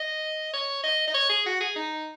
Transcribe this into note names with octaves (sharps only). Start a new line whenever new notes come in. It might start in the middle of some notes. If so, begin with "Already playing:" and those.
Already playing: D#5
C#5
D#5
D#5
C#5
G#4
F#4
G#4
D#4